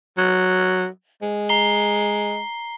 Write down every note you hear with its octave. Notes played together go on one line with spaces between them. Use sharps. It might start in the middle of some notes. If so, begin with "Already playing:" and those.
F#3
G#3
A#5 C7 G7